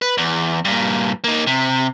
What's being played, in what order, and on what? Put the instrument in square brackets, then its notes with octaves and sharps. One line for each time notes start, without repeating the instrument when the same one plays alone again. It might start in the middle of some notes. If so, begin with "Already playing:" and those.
[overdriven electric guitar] B4
E2
G2 A#2
A#3 D#4
C3